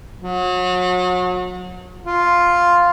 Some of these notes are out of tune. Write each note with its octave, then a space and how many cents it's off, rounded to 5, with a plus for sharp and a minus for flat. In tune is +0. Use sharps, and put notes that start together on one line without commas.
F#3 -35
F4 +0